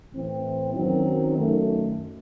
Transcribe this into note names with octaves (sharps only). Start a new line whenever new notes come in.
A2 E3 C4
F#2 D#3 F#3 C4 D#4
F#2 D#3 A3